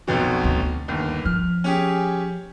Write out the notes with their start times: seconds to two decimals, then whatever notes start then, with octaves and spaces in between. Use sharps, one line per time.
0.07 B1 F2 B2
0.44 D2
0.88 G1 D#2
1.25 F3 F6
1.64 C#4 G4 G#4